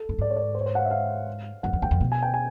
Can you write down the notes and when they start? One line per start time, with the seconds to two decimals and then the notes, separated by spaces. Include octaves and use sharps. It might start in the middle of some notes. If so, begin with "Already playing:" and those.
Already playing: A4
0.09 G2
0.19 G#2 D5
0.30 C#5
0.36 D5
0.42 C#5
0.55 C5
0.61 C#5
0.66 C5
0.75 F#5
0.78 F5
0.85 E5
0.91 F5
1.63 F#2 F#5
1.73 F2
1.82 E2 G5
1.91 F2
2.01 B2
2.12 G#5
2.23 G5
2.34 G#5